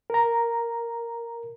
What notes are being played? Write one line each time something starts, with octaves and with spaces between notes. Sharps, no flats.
A#4 A#5